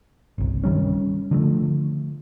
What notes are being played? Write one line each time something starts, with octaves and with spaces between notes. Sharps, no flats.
G1 C2
D#3 G3 C#4
D3 F3 A3